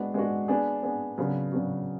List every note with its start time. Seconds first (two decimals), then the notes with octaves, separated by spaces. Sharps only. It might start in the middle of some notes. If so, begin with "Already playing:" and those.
Already playing: G#3 B3 D4 F#4
0.14 G#3 B3 D4 F#4
0.48 B3 D4 G#4
0.83 B3 D4 G#4
1.18 C#3 F#3 B3 D4 F#4
1.52 C#3 F#3 B3 D4 F#4